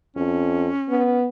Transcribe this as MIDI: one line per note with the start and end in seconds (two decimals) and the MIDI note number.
0.16 0.68 41
0.16 1.20 61
0.89 1.28 59